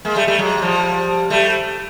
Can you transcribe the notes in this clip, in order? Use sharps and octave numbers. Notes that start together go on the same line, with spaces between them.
G#3 A#3
G3 A3
G3 A3
F#3 G#3
F3 G3
G3 A3